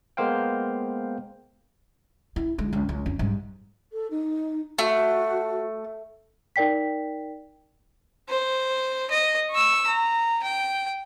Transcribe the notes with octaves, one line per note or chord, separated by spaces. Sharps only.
G#3 A#3 B3 C5 F5 G5
E4
D3 G#3
C#2
C#2
F2 C#4
G#2 G3
A4
D#4
A3 F#4
D#4 A#4 D5 G5 B6
C5
D#5
C#6 E6
A#5
G5